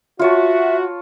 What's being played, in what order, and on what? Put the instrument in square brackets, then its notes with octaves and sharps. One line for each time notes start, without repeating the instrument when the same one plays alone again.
[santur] F4 C#5 A5 [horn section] F#4 [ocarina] E5